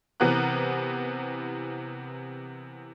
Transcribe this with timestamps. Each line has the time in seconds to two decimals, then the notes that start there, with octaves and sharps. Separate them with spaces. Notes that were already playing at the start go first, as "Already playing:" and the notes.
0.20 C3 E3 B3 A#4 A#5 F#6